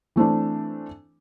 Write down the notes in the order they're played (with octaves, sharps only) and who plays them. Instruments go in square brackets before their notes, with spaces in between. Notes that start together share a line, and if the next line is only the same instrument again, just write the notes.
[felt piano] E3 A3 C4 D4